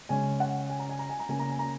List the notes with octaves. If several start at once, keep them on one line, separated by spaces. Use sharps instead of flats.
C#3 G#3 C#4 G#5
F#5
G#5
A#5
G#5
A#5
G#5
A#5
C#3 A#3 C#4 G#5
A#5
G#5
A#5